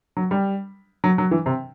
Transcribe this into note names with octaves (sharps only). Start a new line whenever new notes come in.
F#3
G3
F#3
F#3
E3
C3